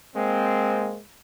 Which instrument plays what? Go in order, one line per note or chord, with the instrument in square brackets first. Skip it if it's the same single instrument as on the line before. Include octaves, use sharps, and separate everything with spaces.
[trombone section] G#3 A#3 C4